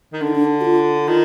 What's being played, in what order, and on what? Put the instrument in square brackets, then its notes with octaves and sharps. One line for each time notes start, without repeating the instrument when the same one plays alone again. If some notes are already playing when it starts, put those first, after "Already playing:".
[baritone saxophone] D#3
[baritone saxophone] D3 [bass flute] D4
[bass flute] D#4
D4
F#4
F4
[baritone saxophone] D#3 [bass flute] F4